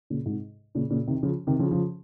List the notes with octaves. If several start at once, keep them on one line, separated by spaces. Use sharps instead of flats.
A#2 C#3
G#2 C3
A#2 C#3
A#2 C#3
C3 D#3
C#3 F3
C3 D#3
C#3 F3
C#3 F3